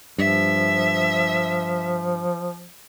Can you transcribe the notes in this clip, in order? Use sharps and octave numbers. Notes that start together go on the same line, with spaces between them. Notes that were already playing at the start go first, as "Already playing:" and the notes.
G2 F3 E5